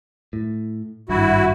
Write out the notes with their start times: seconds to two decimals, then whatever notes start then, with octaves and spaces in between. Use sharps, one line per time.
0.33 A2
1.09 G#1 G2 E4 F#4